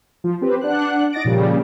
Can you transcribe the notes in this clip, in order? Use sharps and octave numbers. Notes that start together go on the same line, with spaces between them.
F3
C4 G4 B4 C5
D4 F#5 F#6
D#4 D#5 A6 A#6 D7
A#2 C#3 F3 G3